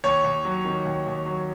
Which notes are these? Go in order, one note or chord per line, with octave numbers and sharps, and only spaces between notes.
D#2 C#5
D#2
F#3
D#3
D#2
D#2
F#3